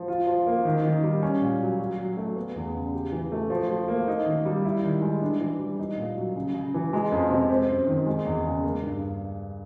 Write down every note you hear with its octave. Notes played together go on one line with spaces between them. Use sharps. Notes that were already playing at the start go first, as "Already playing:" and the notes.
Already playing: F3
F4
F3
A#3
D#3
D#3
G3
C#4
A#2
F#3
F#4
F#3
A3
B3
E2
C#3
G4
E3
A3
F3
F3
A#3
D#4
D#3
G3
E4
D#3
G#3
D4
E3
G3
D#4
A#2
F#3
C#3
C#3
E3
G#3
F2
C3
C4
F#2
D#3
G#3
E2
C#3
A#3
G2